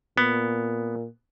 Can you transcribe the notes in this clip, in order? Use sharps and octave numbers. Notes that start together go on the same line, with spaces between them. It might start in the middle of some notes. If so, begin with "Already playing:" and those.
A#2 B3